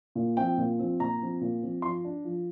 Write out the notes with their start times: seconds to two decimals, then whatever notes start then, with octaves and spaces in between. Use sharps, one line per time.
0.15 A#2
0.37 F3 C4 G5
0.58 A#2
0.79 F3 C4
1.00 A#2 A#5
1.21 F3 C4
1.41 A#2
1.62 F3 C4
1.82 F3 C6
2.04 D4
2.25 F3